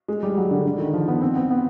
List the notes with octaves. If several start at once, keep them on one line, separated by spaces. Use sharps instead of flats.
G#3
G3
F#3
D3
D3
D#3
F3
B3
C4
B3
B3